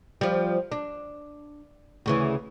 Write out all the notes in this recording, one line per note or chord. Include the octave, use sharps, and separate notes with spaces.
F3 G3
D4
D2 C#3 E3